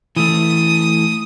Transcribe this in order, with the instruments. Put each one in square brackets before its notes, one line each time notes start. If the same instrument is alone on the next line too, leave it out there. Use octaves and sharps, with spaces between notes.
[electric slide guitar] E3 A3 [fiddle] D#6